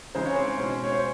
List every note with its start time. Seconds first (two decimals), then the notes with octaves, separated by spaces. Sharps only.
0.15 C#3 E3 G#3 C4 D#4 C5
0.25 C#5
0.36 C4 C5
0.58 B2 G#3 C#4
0.84 C#5
0.92 C5